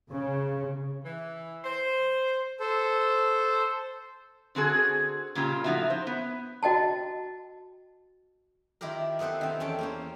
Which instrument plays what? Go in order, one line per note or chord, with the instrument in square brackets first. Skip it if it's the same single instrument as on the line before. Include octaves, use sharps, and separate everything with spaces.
[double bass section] C#3
[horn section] E3
C5
[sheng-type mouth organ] A4 C5
[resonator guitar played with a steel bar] D3 C4 F#4 G#4
A#2 C#3 G3 F4 G4
A2 F3 D#4 F4 F#4 E5
C5
B3
[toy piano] F#4 D#5 G5 A5
[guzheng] D#3 E4 F4 G4 A#4
B3 C4 A4 B4 C5
D#3 C4
E2 C#4 A4 G5
A#3 C#4 C5